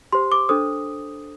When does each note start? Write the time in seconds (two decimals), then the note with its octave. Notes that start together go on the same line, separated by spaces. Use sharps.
0.12 G4 C5 C6
0.32 D6
0.49 D4 A4 C5 D#6